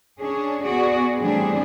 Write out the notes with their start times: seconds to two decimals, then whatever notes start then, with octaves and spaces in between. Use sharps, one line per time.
0.20 C#4 D4 G#4
0.63 B3 F#4 G#4 D5
1.20 A2 E3 G3 C4 D4 G#4